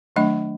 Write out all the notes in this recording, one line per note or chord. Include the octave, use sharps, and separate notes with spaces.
D#3 F#3 A3 D4 D#5